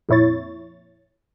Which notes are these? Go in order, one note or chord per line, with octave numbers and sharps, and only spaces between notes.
F2 A#2 E4 C#5 A6